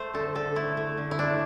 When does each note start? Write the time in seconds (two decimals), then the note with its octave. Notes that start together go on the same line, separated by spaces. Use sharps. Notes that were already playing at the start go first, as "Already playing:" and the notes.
Already playing: A3 C5
0.13 D3 A4
0.35 D3 A4
0.56 A3 E4
0.77 A3
0.97 D3
1.11 E4
1.19 A3 D4